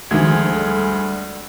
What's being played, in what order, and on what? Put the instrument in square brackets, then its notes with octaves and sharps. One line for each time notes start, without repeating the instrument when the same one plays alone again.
[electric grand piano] D2 G#3 [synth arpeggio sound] D#3 G#6 [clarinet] F3 [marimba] D4 F#4
[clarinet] G3 [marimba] A4